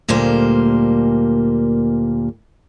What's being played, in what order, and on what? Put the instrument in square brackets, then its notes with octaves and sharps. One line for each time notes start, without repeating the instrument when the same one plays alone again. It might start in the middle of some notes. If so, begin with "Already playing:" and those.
[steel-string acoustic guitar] D2 A#2 G3 A#3 C5